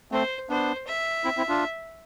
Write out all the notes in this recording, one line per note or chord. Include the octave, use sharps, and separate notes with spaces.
A3 C4 C5
B3 D4 C5
E5
C4 E4
C4 E4
D4 F4